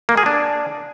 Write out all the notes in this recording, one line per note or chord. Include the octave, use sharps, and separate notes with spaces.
A#3
G#4
D4